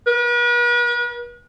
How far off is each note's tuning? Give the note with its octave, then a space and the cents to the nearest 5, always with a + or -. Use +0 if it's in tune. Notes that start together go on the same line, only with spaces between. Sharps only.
B4 -45